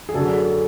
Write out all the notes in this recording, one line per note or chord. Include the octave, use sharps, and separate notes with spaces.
G#4
F#2 D3 F#3 A3 A4